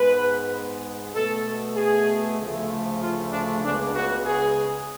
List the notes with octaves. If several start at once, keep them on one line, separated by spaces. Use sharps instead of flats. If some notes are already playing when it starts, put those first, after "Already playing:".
Already playing: G#2 G#3 B3 B4
B2 A3 A4
G#4
D2 C#3 F3 A3
F4
D4
C#2 C#3 G#3 B3 D4
F#4
G#4